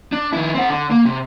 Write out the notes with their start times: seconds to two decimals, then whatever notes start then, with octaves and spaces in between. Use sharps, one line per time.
0.12 D4
0.33 D#3 E4
0.54 C4 F#5
0.69 D3
0.91 A#3
1.05 C3